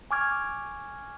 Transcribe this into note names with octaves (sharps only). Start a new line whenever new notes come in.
G#5 C#6 D6 F6 G#6